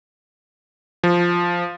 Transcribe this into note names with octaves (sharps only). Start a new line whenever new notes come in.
F3